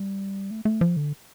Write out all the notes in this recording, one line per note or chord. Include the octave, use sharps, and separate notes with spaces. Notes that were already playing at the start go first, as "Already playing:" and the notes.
Already playing: G3
A3
A3
F3
D3